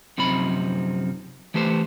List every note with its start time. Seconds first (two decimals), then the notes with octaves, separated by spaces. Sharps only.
0.18 F#2 C3 F3 C4 D#4 B5
1.54 E3 A3 G4 B4 C5